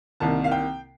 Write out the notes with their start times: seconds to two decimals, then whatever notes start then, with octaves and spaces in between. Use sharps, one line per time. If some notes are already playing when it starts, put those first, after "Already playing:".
0.20 C2 C3 D#3 A#3 A5
0.44 F5
0.51 G5